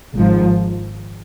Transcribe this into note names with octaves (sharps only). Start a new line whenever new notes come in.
G#1 G#2 F3